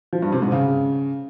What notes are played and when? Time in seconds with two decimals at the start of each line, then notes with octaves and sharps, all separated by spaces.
0.13 F3
0.22 G2
0.32 C3
0.42 G#2
0.52 C#3